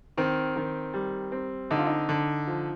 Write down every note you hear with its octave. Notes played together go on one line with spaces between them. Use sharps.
D#3 C4
D#3
G3
C4
D3 D#4
F4
D#4
D3
F3